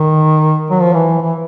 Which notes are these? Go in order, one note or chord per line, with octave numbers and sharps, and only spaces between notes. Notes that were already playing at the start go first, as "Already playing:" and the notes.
Already playing: D#3
F#3
F3
E3
E3